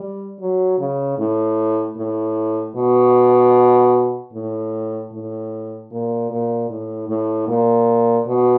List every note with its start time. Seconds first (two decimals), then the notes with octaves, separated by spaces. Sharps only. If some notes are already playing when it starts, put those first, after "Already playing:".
Already playing: G3
0.40 F#3
0.78 C#3
1.18 A2
1.97 A2
2.76 B2
4.33 A2
5.12 A2
5.91 A#2
6.30 A#2
6.69 A2
7.09 A2
7.48 A#2
8.27 B2